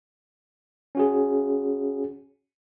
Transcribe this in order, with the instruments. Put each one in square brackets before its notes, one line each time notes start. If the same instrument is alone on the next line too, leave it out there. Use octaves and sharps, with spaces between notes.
[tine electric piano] C#4 F#4 G#4